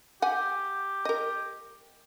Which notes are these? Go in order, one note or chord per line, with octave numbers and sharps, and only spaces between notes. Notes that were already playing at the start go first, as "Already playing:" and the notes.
G4 F#5 G#5
A#4 D#5